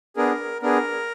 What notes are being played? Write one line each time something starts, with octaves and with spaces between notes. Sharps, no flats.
B3 D4 G#4 A#4
B3 D4 G#4 A#4